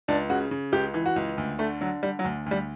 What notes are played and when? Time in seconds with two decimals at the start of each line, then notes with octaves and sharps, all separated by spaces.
0.08 C#2 D4
0.30 C#3 F#4
0.51 C#3
0.72 C#2 G4
0.94 E3
1.06 F#4
1.16 C#2
1.38 D2
1.59 D3 A3
1.81 D3 F#3
2.03 D3 G3
2.19 F#3
2.24 D2
2.46 D2 G3